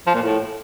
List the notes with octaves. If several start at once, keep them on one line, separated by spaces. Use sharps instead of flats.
F3
A#2
A2